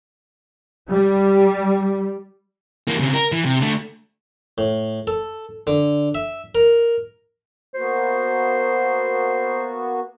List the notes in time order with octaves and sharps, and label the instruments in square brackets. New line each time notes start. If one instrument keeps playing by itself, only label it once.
[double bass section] G3
[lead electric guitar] E3 A#3
C#3 C4
A#4
E3
C3
D3 A3
[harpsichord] A2
A4
D3
E5
A#4
[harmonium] A#3 B3 F#4 [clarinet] C5